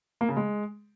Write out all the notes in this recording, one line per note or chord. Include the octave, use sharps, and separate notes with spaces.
A#3
C#3
G#3